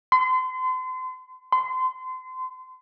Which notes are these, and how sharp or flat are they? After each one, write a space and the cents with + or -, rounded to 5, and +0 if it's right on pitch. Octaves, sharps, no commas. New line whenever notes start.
C6 -35
C6 -30